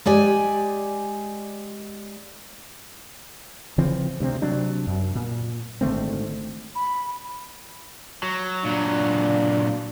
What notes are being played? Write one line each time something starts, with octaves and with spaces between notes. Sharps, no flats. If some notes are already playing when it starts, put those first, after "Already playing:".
G#3 G4 D5 G#5
C#3 E3 F3 C4
D2 C3 G#3 C4
C3 F#3 D4
F#2
A#2
G#1 D3 A3 C4
B5
F#3
A#2 F#3 D4